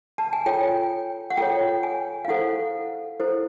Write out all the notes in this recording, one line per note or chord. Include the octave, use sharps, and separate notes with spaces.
A5
G#5
F4 A4 C#5 G5
F#5
F4 A4 C#5 G5
G#5
F5
E4 A4 C5 F#5
E4 A4 C5